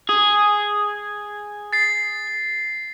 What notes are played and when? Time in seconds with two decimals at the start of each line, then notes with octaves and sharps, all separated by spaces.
0.09 G#4
1.73 A6 C7